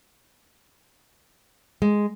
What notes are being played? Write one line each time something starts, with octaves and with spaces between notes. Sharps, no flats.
G#3